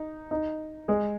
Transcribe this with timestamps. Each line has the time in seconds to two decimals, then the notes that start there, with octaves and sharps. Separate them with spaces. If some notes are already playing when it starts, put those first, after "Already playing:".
Already playing: D#4
0.31 D#4
0.88 G#3 G#4